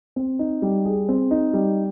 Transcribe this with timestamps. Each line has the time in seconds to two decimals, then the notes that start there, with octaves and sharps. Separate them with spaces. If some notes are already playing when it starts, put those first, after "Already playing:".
0.16 C4
0.39 D#4
0.62 G3
0.85 G#4
1.09 C4
1.31 D#4
1.53 G3